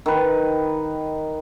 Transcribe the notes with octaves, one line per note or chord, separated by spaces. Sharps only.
D#3 B4